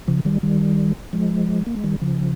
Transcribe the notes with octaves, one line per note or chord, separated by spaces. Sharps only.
C#3 F3
D#3 G3
D#3 G3
F3 G#3
A#3
G#3
D#3 G3
C#3 F3